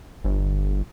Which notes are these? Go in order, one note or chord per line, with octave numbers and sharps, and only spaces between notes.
G1